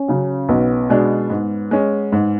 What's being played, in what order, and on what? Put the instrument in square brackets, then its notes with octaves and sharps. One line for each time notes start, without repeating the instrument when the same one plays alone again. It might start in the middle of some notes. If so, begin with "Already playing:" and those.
Already playing: [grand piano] C#4
[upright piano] C#3 F#3
[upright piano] B1 [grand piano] B3
[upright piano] B2 G#3 D4
G#2
G#3 C#4
G#2